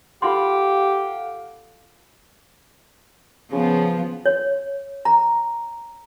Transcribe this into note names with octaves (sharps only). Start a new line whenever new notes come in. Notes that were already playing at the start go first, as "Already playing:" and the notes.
F4 G4 A4 F5 F#5 C6
C#3 F3 B3
C#5
A#5